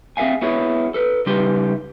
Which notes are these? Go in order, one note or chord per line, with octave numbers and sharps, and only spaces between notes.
C4 G#4 A4 E5 F5 G#5
B3 E4 F#4 G#4 C#5
A4 B4
C#3 G3 D#4 G4 B4 C6